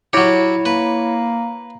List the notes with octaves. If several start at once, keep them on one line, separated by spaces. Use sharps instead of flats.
F#3 E4 G4 C#5 C#7
A#3 B4